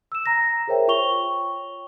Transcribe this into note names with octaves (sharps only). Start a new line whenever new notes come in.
E6 E7
A#5 A#6
G#4 A#4 C5 C#5 E5 G5
F4 C#5 G5 C#6 F7 G7